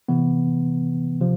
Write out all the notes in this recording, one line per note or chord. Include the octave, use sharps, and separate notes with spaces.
C3 E3 B3
C3 F3